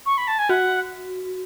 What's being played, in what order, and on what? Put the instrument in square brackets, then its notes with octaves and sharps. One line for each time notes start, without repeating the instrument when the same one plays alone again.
[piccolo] C#6
B5
A5
G#5
[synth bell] F#4 [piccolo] F#5